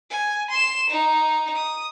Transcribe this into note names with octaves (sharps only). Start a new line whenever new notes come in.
G#5
C6 E7
D#4
D#6